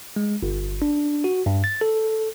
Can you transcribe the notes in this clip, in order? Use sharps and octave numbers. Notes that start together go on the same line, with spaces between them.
G#3
G1
D4
F#4
G2
A6
A4